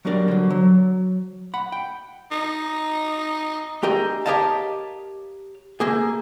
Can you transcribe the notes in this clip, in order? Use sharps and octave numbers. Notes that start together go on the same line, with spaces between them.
F#3 G3 B3 D4 A#4 D5
D3 F#3
F#3
F#5 B5
G5
D#4
A3 D4 G4 G#4 A#4 D#5
G4 A#4 C#5 D#5 F5 A5
A3 A#3 G#4